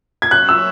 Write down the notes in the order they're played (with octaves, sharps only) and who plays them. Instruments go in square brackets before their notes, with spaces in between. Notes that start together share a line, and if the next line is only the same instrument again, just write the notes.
[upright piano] G#6
[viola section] F#3 C#4 F#4 C#5 E5 [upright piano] F#6
[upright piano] E6